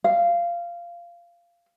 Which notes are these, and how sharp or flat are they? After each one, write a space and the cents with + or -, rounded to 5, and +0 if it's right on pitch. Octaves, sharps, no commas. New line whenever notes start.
F5 -15